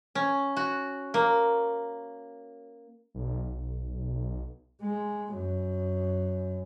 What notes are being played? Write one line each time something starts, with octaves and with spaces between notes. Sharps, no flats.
C#4
F#4
A#3
B1
G#3
F#2